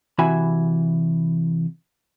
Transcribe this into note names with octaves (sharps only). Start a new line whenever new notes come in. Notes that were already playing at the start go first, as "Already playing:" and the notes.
C3 E3 F#4 E5 G#5 B5